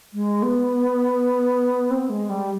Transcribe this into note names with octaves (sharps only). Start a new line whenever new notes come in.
G#3
B3
C4
G#3
G3